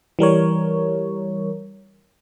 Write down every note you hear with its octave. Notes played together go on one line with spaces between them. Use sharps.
E3 G3 A#4 C#5